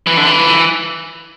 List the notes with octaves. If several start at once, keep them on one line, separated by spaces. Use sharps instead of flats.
E3
D3
E3